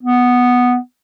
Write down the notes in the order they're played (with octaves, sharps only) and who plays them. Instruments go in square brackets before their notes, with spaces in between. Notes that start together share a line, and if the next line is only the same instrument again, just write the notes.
[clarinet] B3